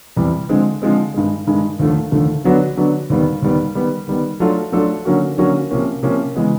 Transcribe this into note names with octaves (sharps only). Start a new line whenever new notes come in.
E2 C3 E3 G3
D3 F3 G#3 C4
D3 F3 G#3 C4
G2 D#3 G#3
G2 D#3 G#3
D#2 D3 F3 A3
D#2 D3 F3 A3
D3 F#3 B3 D4 F#4
D3 F#3 B3 D4 F#4
D#2 D#3 G3 B3
D#2 D#3 G3 B3
D#3 G3 B3
D#3 G3 B3
F#3 A3 D4 F4 A4
F#3 A3 D4 F4 A4
D3 F#3 A#3 C#4 F#4
D3 F#3 A#3 C#4 F#4
C3 F3 A#3 C#4
C3 F3 A#3 C#4
C#3 E3 G#3 B3